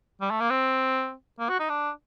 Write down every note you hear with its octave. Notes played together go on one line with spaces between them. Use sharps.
G3
A3
A#3
C4
A#3
F#4
D#4
D4